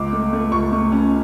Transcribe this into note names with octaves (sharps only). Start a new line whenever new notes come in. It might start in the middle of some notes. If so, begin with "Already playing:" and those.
Already playing: C#2 D6
A3
A3
C#2 C#6
A3
C#4